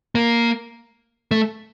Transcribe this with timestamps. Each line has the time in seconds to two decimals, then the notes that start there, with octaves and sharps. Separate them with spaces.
0.15 A#3
1.31 A3